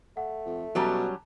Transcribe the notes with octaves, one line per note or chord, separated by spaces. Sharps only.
A3 F#5
F2
B2 F#3 G3 C#4 A5 A#5 F#6